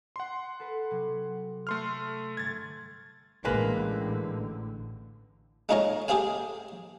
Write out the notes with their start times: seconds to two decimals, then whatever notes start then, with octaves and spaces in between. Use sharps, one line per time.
0.16 F#5 C6
0.60 A4 B4
0.91 C3 F#3
1.67 A3 C6 F6
2.37 G1 G#6 A6
3.45 A1 D3 G#3 A#3 B4
5.69 G#3 A3 D#4 F4 C#5 D#5
6.08 A3 G4 G#4 C5 F5 G#5